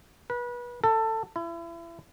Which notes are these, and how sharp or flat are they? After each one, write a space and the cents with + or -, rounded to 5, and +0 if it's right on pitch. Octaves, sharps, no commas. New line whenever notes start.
B4 -30
A4 +20
E4 +35